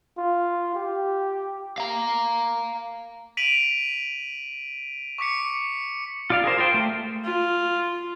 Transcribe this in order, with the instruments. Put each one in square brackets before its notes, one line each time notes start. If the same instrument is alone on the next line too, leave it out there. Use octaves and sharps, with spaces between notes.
[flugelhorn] F4
G4
[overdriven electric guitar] F5 A#5
[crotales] B6 D7 D#7 F7 F#7
C#6 D6 B6 C#7
[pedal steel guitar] F4 D5 F5
G#4 A#4 C5
F4 C5 G5
A3
[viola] F4